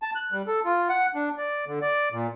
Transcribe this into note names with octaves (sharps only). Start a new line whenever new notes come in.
A5
F#6
G3
A4
F4
F#5
D4
D5
D3
D5
A#2